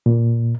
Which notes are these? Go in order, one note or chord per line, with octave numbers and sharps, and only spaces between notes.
A#2